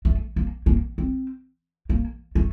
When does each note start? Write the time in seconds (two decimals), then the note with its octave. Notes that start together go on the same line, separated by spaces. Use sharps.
0.05 A3
0.36 A#3
0.66 A#3
0.98 C4
1.89 A#3
2.35 A3